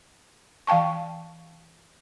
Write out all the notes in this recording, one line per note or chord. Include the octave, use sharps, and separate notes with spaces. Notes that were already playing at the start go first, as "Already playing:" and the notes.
E3 F5 G5 A5 C#6